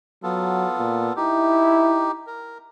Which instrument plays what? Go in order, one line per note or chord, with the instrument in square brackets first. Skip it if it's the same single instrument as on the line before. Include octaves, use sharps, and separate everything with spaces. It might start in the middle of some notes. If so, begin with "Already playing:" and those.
[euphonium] F#3 [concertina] B3 F4 A4
[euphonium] A#2
[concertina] D#4 G4 [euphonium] E4
[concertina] A#4